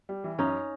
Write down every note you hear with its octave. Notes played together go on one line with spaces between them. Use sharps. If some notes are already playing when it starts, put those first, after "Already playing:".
G3
E3
F#2 C#4 D#4